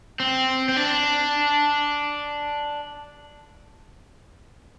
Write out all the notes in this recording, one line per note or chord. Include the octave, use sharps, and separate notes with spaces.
C4
C4
D4